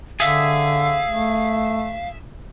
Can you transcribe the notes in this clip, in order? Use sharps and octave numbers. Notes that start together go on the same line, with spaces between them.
D3 G#4 E5 F5
A3